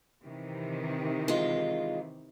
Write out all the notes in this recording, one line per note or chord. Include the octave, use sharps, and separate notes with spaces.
C3 D#3 E3
G#3 F4